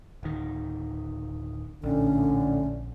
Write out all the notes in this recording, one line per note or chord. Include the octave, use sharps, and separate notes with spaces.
D1 D#3
A#1 A2 D3 C#4